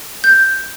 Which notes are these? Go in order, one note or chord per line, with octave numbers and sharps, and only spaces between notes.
G6